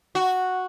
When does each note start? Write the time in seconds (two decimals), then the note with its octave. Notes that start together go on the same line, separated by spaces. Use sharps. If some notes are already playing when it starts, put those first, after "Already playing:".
0.15 F#4